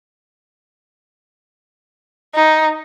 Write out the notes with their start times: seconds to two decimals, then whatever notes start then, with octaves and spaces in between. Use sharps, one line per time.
2.34 D#4